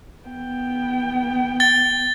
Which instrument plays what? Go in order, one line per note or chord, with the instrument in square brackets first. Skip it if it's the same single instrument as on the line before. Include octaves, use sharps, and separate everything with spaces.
[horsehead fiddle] B3 G5
[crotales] A6 G7